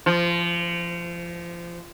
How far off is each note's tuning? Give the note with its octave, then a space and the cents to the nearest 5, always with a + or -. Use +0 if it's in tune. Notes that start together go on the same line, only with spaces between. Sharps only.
F3 -25